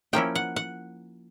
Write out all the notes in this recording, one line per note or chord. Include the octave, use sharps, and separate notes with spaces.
F3 A#3 C#4 E4 G5
F#5
F#5